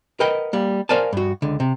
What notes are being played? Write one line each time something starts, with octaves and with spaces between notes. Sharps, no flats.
A#4 B4 D#5 F#5 G5
G3 A#3
A#4 C5 D5 F5 G#5 A5
G2 F#4
C#2 D3
C3